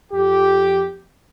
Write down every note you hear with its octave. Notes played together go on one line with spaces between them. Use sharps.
F2 G4